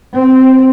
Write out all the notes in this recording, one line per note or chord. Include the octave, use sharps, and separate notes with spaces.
C4